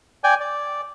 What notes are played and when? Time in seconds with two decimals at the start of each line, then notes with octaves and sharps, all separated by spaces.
0.24 D5 G5 G#5
0.40 D5